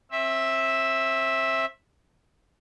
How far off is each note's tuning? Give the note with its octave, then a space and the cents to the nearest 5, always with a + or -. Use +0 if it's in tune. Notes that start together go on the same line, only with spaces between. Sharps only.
C4 +35 E5 -5